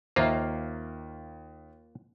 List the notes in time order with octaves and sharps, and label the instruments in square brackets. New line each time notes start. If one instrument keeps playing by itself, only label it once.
[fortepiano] D#2 [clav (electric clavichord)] A#3 F4 [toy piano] C5 E5 A#5